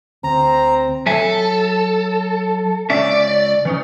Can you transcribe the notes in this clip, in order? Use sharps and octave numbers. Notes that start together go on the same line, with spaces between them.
D2 C4 A#5
F#3 A4 E5 G#5
C#2 C#4 D5 E5
E3 C#4 D#4